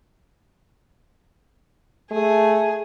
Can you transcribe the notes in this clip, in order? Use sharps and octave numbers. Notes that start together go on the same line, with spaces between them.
A3 G#4